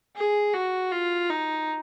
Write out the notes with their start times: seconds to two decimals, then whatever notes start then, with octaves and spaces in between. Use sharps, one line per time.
0.16 G#4
0.53 F#4
0.91 F4
1.30 D#4